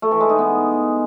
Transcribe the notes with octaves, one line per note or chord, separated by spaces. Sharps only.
A3
E3
G#3
D#4
B3